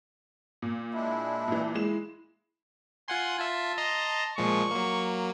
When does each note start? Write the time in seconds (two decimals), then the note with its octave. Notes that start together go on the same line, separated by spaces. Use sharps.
0.62 A#2
0.94 G#3 D4 E4 E5
1.48 A#2 E3
1.75 G#3 E4 E7
3.08 F4 F#5 G#5 C6
3.39 F4 E5 A5
3.78 D#5 A#5 C6
4.38 A#2 F3 G#3 C#6
4.71 F#3 A#3